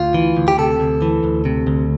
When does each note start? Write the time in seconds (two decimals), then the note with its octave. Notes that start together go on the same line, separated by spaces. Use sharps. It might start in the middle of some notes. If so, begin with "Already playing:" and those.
Already playing: D2 F4
0.14 E3
0.37 D2
0.48 G4
0.58 C3 A4
0.80 D2
1.02 E3
1.24 D2
1.45 C3
1.67 D2